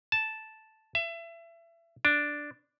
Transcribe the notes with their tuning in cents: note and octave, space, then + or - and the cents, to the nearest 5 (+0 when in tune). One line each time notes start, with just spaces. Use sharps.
A5 -5
E5 +30
D4 +0